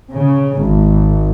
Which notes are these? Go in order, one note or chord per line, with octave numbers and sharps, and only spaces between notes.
C#3
G#1